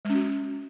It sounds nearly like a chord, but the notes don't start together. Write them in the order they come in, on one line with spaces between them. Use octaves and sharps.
G#3 C#4 F#4